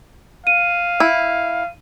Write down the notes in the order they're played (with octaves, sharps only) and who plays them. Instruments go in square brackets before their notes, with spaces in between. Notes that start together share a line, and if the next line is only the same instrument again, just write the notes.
[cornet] F5 [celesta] D#7
[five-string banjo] E4